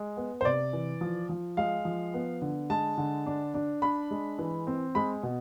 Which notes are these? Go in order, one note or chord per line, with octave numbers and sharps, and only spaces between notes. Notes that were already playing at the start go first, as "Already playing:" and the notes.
Already playing: G#3
B3
C5
C3 D5
E3
F3
F3
G#3 F5
F3
B3
D3
G#3 A5
D3
D4
D4
D4 B5
G#3
E3
C4
G#3 B5
B2